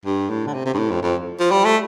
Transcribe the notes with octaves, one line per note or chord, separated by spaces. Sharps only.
G2
A2
D3
C3
C3
G2
A2
F2
F2
F3
G3
A3